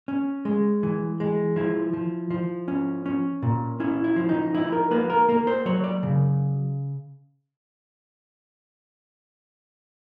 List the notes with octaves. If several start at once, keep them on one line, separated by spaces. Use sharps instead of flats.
C#4
G#3
E3
G#3
F3 E4
F3
F3
C#4
C#4
A#2
C#4 E4
E4
F3
D#4
D#4 E4
A#4
A#3 B4
A#4
A#3 A#4
C5
F#3 C#5
D5
C#3